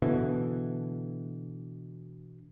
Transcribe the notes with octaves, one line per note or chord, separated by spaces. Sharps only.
B2 D3 E3